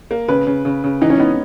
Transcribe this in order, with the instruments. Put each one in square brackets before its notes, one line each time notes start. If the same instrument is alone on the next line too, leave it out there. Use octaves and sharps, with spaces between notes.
[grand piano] A#3
[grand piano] C#3 [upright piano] B4
[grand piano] C#3
C#3
C#3
[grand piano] E3 [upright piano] D#4
[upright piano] C#4
[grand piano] B3 [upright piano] D#4